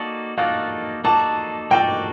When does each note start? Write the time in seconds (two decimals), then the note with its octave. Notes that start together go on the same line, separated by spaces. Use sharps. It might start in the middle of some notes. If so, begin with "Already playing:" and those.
Already playing: A#3 D#4 F#4 A4 D5
0.38 A#3 D#4 F#4 A4 D5 F5
1.04 A#3 D#4 F#4 A4 D5 A5
1.71 A#3 D#4 F#4 A4 D5 G5